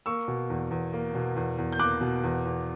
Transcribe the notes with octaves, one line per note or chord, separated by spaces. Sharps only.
A#3 C#6 E6
B2
E2
E2
A#3
B2
E2
E2
G6
A#3 D6 F#6
B2
E2
E2